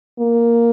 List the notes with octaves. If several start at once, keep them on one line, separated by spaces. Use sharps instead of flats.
A#3